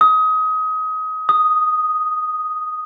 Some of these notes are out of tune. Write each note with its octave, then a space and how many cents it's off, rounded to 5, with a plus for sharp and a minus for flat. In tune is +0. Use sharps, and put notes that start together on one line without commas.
D#6 +25
D#6 +0